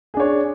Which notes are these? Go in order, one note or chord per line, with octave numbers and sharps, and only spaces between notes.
D4 G#4 C#5